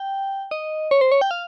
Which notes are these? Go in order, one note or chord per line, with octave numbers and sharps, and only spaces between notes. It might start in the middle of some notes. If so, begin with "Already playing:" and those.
Already playing: G5
D#5
C#5
C5
C#5
G5
F5